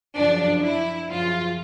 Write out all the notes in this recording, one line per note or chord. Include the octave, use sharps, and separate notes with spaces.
F#2 C#3 F3 D4
E4
F#2 C#3 F3 F4